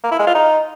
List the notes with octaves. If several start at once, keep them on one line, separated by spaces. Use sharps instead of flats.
A#3
E4
G#3
F4
D#4